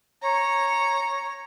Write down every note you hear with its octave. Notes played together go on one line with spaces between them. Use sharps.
C#5 A#5